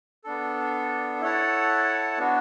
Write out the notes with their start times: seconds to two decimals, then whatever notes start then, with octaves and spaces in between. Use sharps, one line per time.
0.24 B3 D4 A4
1.21 E4 A4 C#5 F#5 A5
2.18 B3 D4 F#4